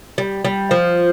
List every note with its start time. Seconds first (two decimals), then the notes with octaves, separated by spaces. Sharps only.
0.18 G3
0.45 G3
0.71 F3